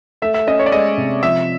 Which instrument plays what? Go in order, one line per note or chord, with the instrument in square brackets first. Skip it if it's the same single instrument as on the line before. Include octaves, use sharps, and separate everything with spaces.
[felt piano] A3 [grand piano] E5
[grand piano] E5
[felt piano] C#4 [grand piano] D#5
[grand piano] C#5
D5
[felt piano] G#3 [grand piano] D#5
[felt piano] C3
[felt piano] F3 [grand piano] E5